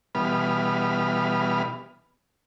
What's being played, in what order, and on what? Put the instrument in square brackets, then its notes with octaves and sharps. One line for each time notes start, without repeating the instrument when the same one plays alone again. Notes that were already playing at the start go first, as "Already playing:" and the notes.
[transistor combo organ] B2 E3 G3 B3 B5 F6